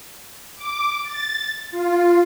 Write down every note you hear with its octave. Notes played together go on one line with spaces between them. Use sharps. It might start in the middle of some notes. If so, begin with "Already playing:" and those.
D6
A6
F4